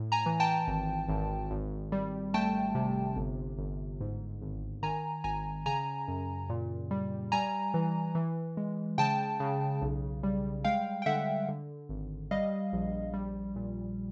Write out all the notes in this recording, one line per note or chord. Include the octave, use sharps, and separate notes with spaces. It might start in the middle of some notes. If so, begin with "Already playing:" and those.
Already playing: A2
G#5 A#5
E3
G5 A5
G#1
G#1
G#1
G3
A3 G5 A5
C3
G1
G1
G#2
G#1
D#3 G#5 A#5
G#1 G#5 A#5
C#3 G#5 A#5
F#2
A#2
G3
G3 G#5 A#5
E3
E3
G#3
C#3 G5 A5
C#3
B1
G3
G#3 F5 G5
G5
D3 E5 F#5
D3
G#1
G3 D#5 F5
A#1
G3
A#2